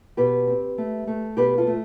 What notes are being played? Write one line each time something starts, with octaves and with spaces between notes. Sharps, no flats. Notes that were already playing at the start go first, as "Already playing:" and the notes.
B2 G4 B4
C4
A3
A3
B2 G4 B4
F4 A4
A3